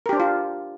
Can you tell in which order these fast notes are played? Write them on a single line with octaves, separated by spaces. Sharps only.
A#4 G4 D4 C5 F4